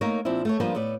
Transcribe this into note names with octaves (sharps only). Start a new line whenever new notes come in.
A3 A#3 D#4 A#4 C#5
A#2 F3 C4 D4 E4
A3 A4 C#5
F3 G3 A#3 B3 D4 F4
A2 B3 D5